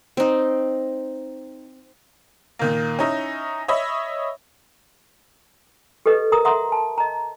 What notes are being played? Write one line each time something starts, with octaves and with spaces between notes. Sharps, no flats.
C4 D#4
A#2 D#3 A#3
C#4 D#4 E4
C#5 D#5 E5 B5
G4 A4 B4 D#5
A#4 A#5 D#6
E5 F#5 A#5 C6 D#6
A5
D#5 A#5